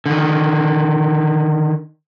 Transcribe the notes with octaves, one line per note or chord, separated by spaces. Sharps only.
D3 D#3